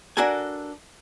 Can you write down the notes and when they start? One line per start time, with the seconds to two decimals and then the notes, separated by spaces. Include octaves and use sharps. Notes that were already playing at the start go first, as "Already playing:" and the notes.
0.17 D4 F#4 A4 A#4 G#5